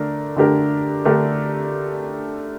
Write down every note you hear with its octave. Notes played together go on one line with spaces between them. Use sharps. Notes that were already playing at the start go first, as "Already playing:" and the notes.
Already playing: D3 A3 D4 A#4
D3 A3 D4 G4 A#4
D3 A3 D4 G4 A#4